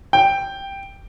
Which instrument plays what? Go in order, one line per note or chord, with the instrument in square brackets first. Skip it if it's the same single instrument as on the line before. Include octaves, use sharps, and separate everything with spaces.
[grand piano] G5